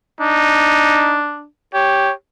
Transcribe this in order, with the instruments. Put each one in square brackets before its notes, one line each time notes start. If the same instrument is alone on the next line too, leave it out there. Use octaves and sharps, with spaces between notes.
[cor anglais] D4 [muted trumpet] D#4
[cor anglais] G4 [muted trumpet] C#5